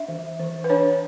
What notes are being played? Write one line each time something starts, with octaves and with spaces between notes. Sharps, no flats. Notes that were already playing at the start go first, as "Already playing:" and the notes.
Already playing: D4 E5
E3
E3
B4
D4 C#5